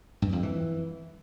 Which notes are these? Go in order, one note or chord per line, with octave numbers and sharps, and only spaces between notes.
G2
F2
E3